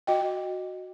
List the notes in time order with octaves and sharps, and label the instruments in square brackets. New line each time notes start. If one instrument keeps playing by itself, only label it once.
[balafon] F#4 D#5 G5